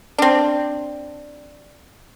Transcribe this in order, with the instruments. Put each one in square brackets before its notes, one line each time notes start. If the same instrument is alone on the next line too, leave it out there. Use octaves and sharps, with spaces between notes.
[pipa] C4 D4